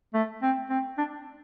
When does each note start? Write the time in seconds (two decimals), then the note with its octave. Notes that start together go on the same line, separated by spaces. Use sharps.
0.13 A3
0.42 C4
0.69 C4
0.98 D4